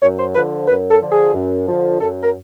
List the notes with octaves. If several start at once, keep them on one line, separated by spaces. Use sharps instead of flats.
F#2 C#5
C5
D3 F3 B4
F#2 B4
A4
D3 F3
G#4
F#2
D3 F3
F#2 A4
A#4